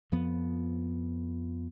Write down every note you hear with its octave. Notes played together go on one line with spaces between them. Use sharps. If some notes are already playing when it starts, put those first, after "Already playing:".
F2 F3 B3